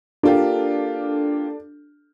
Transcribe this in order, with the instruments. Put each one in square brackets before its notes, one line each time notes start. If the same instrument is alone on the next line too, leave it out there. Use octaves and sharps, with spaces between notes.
[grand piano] A#3 F4 G4 [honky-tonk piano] D4 A4